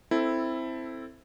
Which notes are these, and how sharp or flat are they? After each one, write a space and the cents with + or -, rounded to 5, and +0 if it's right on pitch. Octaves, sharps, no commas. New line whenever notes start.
C4 +0 E4 +0 A4 +15